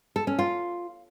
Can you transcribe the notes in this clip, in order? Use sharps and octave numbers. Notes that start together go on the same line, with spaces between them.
A4
C#4
F4